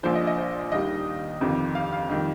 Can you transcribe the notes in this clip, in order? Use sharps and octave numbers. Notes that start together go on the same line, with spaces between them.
A#1 A#2 F3 C5
D#5
D#5
C5
D#2 D#3 G3 D#5
G1 F2 C3 D#3
F5
F5
F2 D#3 G3